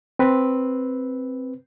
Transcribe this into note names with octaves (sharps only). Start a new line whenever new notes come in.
C4 B4